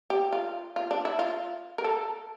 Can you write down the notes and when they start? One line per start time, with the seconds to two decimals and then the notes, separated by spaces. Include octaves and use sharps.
0.10 G4
0.33 F4
0.76 F4
0.91 D4
1.05 E4
1.19 F4
1.78 A#4
1.84 A4